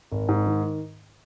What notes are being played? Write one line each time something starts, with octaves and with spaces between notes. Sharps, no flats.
G#1
G#2
D#3